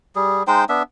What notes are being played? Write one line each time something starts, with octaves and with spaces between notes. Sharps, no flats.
G3 G#4
G#3 D#4 C5 G5
B3 D4 E5